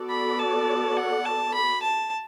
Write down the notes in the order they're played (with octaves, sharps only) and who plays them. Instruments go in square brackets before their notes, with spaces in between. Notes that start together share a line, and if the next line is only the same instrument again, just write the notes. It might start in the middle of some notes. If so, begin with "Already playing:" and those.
Already playing: [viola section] B3 F#4 A4 D5
[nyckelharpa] B5
A5
F#5
A5
B5
A5